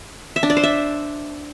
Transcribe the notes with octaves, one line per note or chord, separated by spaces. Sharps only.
E5
D4
D5
C5
E5